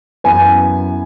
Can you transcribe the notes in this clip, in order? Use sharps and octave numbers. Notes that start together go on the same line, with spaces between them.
F#2 E3 B3 G#5